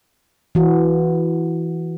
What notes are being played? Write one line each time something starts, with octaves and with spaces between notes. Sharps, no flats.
E3 F#4